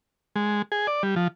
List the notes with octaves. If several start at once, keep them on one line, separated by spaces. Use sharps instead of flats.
G#3
G#4
D5
G3
F3